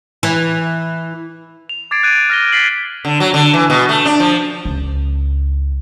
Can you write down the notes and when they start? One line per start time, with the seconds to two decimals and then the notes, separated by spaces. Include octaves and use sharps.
0.23 E3
1.69 F7
1.91 D6 G#6 A6 C7 D7
2.03 F#6 G#6 D7 D#7
2.30 F6 F#6 A#6 D#7 G7
2.52 A6 B6 C7 F#7
3.05 D3
3.20 F#3
3.34 D3
3.54 E3
3.70 B2
3.89 A3
4.06 D4
4.20 F3
4.65 C#2